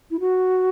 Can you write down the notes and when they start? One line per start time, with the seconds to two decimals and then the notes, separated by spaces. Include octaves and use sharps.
0.11 E4
0.20 F#4